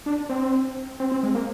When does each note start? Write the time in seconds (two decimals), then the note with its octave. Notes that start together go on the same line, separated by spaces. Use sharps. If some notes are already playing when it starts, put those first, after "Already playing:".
0.06 D4
0.29 C4
1.00 C4
1.12 C4
1.23 G#3
1.35 A#3